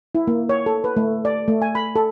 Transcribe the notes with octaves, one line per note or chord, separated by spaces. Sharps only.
E4
A#3
C#5
A4
B4
A3
D5
A3
G#5
B5
A4